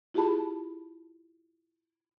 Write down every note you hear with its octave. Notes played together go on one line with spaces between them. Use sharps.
E4 F4 G4 G#4 A5 B5